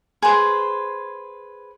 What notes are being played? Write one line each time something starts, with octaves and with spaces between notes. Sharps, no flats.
G#4 B4 C5